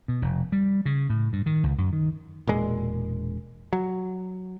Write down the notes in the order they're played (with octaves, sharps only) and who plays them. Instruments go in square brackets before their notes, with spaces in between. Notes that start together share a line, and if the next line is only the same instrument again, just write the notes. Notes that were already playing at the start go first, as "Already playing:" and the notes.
[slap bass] B2
F1
G3
C#3
A2
G2
D#3
C#2
F#2
D#3
[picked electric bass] E1 A#2 G#3
F#3